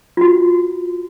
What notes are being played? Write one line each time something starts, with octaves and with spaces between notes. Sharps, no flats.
F4 F#4